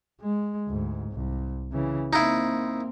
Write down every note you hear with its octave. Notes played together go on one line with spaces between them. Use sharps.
G#3
D2 G#2
C2
C#3 E3
A#3 C4 D#4 E4